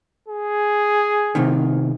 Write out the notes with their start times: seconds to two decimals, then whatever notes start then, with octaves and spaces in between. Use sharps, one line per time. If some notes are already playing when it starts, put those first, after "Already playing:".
0.28 G#4
1.35 C2 C3 D#3